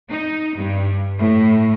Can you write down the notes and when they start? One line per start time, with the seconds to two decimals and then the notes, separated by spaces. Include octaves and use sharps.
0.10 D#4
0.57 G2
1.17 A2